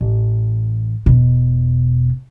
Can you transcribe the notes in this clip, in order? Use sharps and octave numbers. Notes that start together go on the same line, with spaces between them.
A1
E1 B2